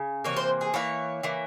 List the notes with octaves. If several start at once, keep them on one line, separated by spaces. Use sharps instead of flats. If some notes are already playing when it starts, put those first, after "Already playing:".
Already playing: C#3
C3 E3 A#3 C#5
C5
G#4
E3 A#3 C#5
E3 A#3